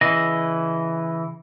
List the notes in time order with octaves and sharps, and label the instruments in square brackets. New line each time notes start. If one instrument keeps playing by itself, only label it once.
[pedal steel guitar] C#3 E3 D#5